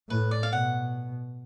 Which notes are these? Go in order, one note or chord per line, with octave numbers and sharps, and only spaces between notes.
A2 B4
D5
F5
B2 F#5